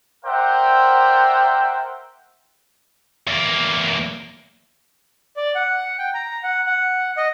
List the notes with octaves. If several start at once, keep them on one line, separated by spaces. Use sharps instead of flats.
A#4 C5 D5 E5 F#5 G5
E2 A#3
D5
F#5
G5
A#5
F#5
F#5
D#5